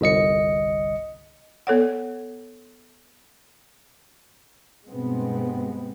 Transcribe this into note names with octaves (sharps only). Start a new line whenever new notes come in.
G1 C2 D#5 C#7
B3 A4 C#5 F#5
G2 B2 G#3 B3 C4